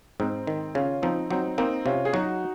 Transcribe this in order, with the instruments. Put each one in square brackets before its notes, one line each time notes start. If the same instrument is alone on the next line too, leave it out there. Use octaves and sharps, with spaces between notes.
[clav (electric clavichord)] G#2 [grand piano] C4 D#4
[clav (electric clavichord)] D#3
[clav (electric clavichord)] C#3 [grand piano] C#4 F4
[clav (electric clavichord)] F3 [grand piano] C4 D#4
[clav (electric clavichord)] F#3 [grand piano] C4 D#4
[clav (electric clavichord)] A#3 [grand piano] C4 D#4
[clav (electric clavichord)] C3 [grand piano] C#4 F4
[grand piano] G#4
[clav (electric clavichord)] F#3 [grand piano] D#4 F#4